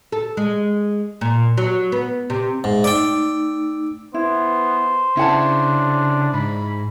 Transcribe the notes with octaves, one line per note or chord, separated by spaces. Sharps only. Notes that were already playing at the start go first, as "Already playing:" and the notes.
A4
G#3
A#2
F#3
B3
C3
G#2 E5
A3 D#4 D5 G5 E6
B3 E4 C5
C#3 D4 E4 F#5 A5
G#2 B5